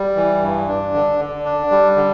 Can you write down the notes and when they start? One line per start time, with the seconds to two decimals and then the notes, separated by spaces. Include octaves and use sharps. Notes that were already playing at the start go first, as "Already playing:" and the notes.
Already playing: G3
0.16 E3
0.42 G2
0.68 D4
0.94 D3
1.20 D3
1.45 D4
1.71 G3
1.96 D3